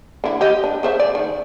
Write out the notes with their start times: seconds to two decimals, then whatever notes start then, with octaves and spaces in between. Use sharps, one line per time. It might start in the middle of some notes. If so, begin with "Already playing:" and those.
0.24 D3 E4
0.41 G4 D#5
0.64 D4
0.83 C#3 C5 E5
0.99 D5
1.15 D#3